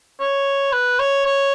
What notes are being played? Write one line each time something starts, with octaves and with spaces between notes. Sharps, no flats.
C#5
B4
C#5
C#5